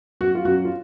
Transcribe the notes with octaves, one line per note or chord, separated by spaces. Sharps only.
F#2 F#4
F4
F#2 F#4
F4